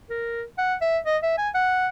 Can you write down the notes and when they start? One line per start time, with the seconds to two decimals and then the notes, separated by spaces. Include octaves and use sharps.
0.10 A#4
0.58 F#5
0.81 E5
1.06 D#5
1.23 E5
1.38 G#5
1.54 F#5